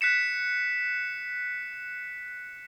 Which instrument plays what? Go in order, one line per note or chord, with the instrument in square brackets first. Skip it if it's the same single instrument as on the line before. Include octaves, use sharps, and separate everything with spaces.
[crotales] F#6 B6 C#7 E7